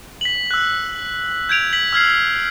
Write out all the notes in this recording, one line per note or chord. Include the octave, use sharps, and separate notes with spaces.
B6 F#7
E6 F#6
G6 G#6 D7 F7
B6 F#7
E6 F6 G#6 C7